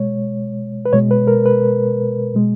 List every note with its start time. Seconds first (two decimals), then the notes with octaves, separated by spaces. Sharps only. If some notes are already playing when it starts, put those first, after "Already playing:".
Already playing: B2 G#3 C#5
0.85 B4
0.93 B2 G#3 C#5
1.11 B4
1.27 A#4
1.46 B4
2.34 B2 G#3